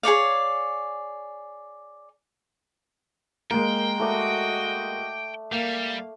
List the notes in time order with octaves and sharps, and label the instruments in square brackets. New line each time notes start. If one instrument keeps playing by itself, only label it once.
[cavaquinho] G#4 C#5 D5 F5
[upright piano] G#3 A#3 [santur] A#4 [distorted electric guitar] G5
[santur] A3 D5 [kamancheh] F#4 D#5
[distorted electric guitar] G3 [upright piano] A#3 [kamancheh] F5